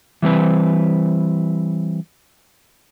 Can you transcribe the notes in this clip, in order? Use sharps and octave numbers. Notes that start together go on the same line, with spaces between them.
E3 G3 C4 B4